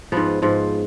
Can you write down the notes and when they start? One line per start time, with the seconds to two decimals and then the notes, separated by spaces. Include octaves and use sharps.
0.12 G#2 F3 B3
0.42 G#2 F3